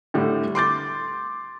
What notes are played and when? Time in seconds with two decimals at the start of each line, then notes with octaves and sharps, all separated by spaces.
0.14 A2 D3 G3
0.55 C6 D6 G6 A6